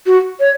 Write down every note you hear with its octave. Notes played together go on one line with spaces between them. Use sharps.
F#4
C#5